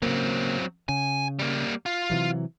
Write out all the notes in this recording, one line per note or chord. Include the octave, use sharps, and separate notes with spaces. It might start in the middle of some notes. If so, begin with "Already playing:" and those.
C#3 F#3 A#3 C4
C#3 G#5
G3 A#3
F4
C3 E3 F#3